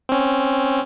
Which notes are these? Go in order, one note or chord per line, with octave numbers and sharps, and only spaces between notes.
C4 C#4